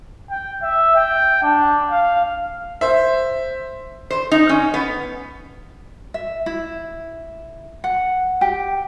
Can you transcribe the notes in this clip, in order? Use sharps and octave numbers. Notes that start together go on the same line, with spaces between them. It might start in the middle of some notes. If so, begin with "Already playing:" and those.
G5
E5
G5
D4
F5
C5 E5
C5
D#4
C#4
B3
E5
E4
F#5
G4